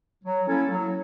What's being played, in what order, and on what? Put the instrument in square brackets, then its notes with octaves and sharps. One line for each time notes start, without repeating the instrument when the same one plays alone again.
[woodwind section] F#3
A#3 C#4 E4 A4
F#3